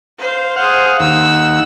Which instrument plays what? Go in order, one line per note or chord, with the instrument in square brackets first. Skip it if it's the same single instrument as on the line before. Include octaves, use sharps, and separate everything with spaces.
[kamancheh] C5 F5
[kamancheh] G#4 C5 [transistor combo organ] F5 F#5
[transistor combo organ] D#2 F#5 [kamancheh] E6